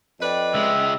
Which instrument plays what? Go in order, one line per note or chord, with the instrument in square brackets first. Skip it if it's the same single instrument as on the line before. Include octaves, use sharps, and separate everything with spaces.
[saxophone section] F2 B4 D5 [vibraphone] D#5 G5
[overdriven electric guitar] C#2 G#3 [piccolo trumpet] E5